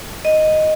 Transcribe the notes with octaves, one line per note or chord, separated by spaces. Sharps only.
D#5